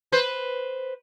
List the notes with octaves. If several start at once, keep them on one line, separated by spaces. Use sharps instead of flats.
B4 C5